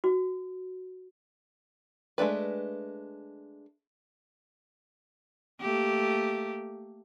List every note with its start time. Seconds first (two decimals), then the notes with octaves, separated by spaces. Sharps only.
0.04 F#4
2.18 G#3 A3 D4 B4
5.61 A3 A#3 G4